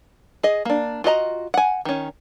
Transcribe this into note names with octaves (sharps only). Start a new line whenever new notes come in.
G#4 D#5
A#3 D4
F4 F#4 D#5 A#5
F#5 G#5
D#3 C#4